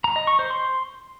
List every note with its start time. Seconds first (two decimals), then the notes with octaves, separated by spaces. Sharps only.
0.04 A#5
0.16 D#5
0.27 C#6
0.39 C5
0.50 C6